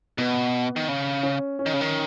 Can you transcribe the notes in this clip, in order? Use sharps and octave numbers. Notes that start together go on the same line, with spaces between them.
B2 B3
D#3
C#3
C#4
C#4
D#3
C#3
D#3